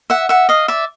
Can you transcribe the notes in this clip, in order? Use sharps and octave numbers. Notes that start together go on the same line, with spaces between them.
E5 F#5
E5 F#5
D#5 F5
D5 E5